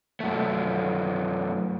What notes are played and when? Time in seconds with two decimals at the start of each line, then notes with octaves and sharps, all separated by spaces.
0.20 F#2 A3